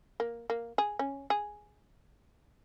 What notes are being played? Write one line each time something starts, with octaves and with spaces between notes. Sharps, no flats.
A#3
A#3
G#4
C#4
G#4